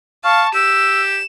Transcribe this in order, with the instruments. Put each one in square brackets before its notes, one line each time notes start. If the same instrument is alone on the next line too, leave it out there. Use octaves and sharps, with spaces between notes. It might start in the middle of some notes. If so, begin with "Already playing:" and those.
[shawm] F5 [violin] A5 [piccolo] C#6
[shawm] G4 [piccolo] E6 [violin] E7